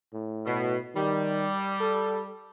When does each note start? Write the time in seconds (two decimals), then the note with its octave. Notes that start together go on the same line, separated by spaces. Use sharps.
0.14 A2
0.46 B2
0.96 D#3 G3
1.81 A4